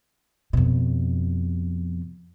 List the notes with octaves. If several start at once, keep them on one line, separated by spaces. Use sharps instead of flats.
F2 B2